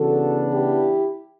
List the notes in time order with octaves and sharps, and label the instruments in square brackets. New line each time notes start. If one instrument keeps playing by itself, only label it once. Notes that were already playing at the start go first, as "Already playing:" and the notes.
Already playing: [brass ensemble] C#3 E3 B3 D4 F#4 A4
E4 G4